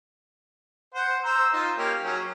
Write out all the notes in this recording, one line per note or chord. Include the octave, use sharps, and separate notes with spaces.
C5 F#5
C5 A#5 E6
D#4 F4 D#5
A#3 C#4 G4
F#3 C#4 G#4